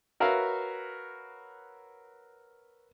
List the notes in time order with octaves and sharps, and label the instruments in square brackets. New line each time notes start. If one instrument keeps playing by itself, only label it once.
[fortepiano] F#4 A#4 B4 C#5 E5 F5